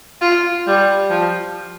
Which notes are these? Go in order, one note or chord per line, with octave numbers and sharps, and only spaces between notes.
F4
G3
F3